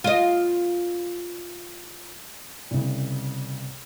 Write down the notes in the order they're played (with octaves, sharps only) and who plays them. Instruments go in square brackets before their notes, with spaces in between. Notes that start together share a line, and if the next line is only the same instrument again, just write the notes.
[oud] F4 D#5
[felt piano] C2 C#3